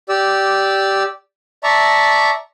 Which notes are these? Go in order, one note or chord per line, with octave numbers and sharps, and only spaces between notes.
G4 D5 E6
D5 E5 A5 A#5 C#6